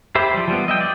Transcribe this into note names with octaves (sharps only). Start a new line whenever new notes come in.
G4 C5 E5 B5
F3 G3
F3 G3 B3
D#5 E5 G5
D5